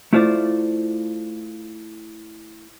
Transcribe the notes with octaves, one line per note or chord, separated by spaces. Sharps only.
A3 E4 F4 C5 D5